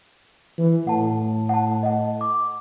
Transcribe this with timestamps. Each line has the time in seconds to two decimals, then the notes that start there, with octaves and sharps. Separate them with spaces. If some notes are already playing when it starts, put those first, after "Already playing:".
0.58 E3
0.87 A2 F#5 A5
1.49 F#5 A5
1.83 D#5 F#5
2.21 D6